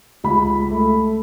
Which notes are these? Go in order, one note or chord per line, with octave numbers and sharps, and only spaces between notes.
C#2 B5
A3